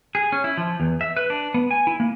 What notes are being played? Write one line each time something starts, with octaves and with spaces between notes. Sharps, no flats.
G#4
C#4
E4
F3
E2
E5
B4
D4
B3
G#5
E4
A#3